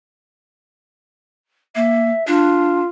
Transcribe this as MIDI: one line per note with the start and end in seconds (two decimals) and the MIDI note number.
1.75 2.09 58
1.75 2.26 76
2.27 2.80 62
2.27 2.87 65